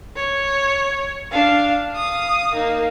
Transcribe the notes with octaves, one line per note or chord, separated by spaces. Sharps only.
C#5
D4 F5
F5 D#6
A#3 D#4